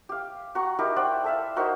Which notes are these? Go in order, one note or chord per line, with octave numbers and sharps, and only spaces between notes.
G4 F5
F#4 A#5 C#6
D#4 E4 G4 A#4
C5 D5 F#5 G5
A4 E5 F5
D#4 F#4 A#4 C5